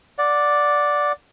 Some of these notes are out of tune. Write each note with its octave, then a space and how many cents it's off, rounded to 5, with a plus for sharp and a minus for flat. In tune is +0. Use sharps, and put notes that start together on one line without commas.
D5 +0 F#5 -20